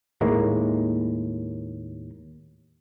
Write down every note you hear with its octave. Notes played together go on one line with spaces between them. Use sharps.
D#2 A2 G#3 A#3